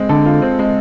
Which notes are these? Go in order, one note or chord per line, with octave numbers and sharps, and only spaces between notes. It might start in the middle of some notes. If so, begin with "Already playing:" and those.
Already playing: G#3 C4
D3 A4
F4
C4
G#3